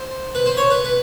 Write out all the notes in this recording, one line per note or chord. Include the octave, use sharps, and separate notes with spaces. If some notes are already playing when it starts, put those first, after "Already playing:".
Already playing: C5
B4
C5
C#5
B4
B4